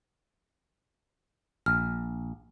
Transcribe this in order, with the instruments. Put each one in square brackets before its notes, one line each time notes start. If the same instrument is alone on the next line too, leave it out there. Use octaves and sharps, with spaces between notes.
[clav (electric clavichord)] A#1 [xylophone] F6